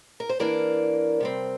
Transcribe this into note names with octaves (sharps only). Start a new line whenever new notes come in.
A#4
C5
E3 A#3 D4 A#4 D5
C3 G3 C4